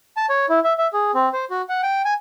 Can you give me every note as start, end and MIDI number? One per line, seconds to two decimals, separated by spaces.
0.17 0.26 81
0.29 0.46 73
0.49 0.59 64
0.64 0.73 76
0.78 0.87 76
0.93 1.11 68
1.14 1.29 60
1.33 1.45 72
1.50 1.62 66
1.69 1.81 78
1.83 2.02 79
2.05 2.14 80